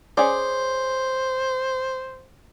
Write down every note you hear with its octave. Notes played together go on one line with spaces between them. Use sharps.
C#4 G#4 C5 D5